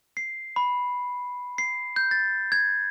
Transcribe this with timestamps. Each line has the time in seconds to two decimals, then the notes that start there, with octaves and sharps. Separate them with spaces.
0.17 C7
0.56 B5
1.58 C7
1.96 G6
2.11 A6
2.52 G#6